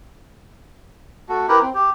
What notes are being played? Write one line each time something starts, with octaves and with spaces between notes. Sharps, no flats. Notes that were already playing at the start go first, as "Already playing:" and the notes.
A3 F#4
E4 G4 A#4 B4
C4
G4